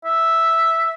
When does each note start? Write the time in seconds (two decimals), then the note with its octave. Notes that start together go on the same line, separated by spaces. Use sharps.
0.05 E5